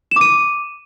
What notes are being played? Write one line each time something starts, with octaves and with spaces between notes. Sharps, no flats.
D6 D#7 E7